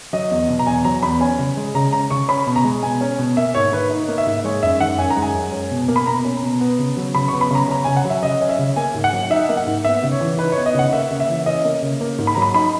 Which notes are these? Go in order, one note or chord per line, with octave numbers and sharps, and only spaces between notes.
F#3 D#5
E2
B2
A#5
E2 G#5
F#3 A#5
E2 B5
C#4 G#5
C#3
G#3
C#3 A#5
C#4 A#5
C#3 C#6
C#4 B5
B2
A#5
G#3
B2 G#5
C#4
B2
A#3 E5
G#2 C#5
D#3 B4
D#4
A#3
E5
G#2
G#3 C#5
F#2 E5
D#3 F#5
F#2 G#5
A#5
G#3
G#5
F#2
C#4
B2
A#3
B5
B2 A#5
C#4
B2
B3
C#3
F#3
C#3 B5
C#6
B3
B5
C#3 A#5
C#4 A#5
C#3 G#5
F#5
F#3
E5
C#3 D#5
C#4
E5
C#3
A#3 G#5
G#2
F#5
F#3
D#4 E5
A#3
F#5
G#2
B3 E5
C#3
C#5
E3
D#4 B4
C#5
B3
D#5
C#3 F#5
A#3 E5
C#3
E5
E3
C#4 D#5
A#3
C#3
A#3
G#2
B5
F#3 A#5
B5
D#4 B5